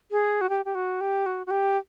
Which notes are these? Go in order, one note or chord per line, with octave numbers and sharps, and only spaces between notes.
G#4
F#4
G4
G4
F#4
G4
F#4
F#4
G4